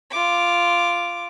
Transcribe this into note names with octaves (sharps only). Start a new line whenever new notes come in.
F4 D6